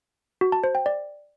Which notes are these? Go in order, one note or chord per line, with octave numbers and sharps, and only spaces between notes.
F#4
A5
C5
G5
D5